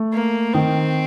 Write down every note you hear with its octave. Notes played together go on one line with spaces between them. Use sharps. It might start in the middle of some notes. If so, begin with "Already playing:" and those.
Already playing: A3
A#3
D#3 C4